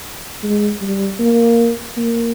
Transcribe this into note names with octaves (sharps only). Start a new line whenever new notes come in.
G#3
G3
A#3
A#3